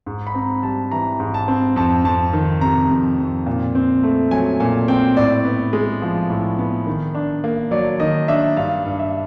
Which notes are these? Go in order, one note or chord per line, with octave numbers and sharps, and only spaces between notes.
G#2
B5
C4 A#5
G3 A5
E3 A#5
G#2
A5
C4
F2 A5
F2 A5
D#3
C3 A#5
F2
F2
A#2
C4
A3
F#3 G#5
A#2 G#5
C4 G5
A2 D5
B3
G#3
F3
A2
B3
D#3
D4
A#3
F#3 D5
D#3 D#5
D4 E5
G2 F5
G2
E5